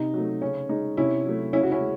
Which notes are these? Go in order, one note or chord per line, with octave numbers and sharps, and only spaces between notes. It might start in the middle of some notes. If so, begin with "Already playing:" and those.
Already playing: C3 D#4
F#3 A3
C#3 C#4
G#3 D#4
C3 C#4 E4
F#3 A3
C#3 C#4 E4
F#4
C#4 E4
G#3